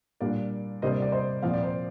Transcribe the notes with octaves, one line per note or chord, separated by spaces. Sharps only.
A#2 G3 A#3 D4 D5 F5
C3 G3 A#3 D4 C5 D#5
D5
D5
C5 D#5
A#2 F3 C4 D5 F5
D5
C5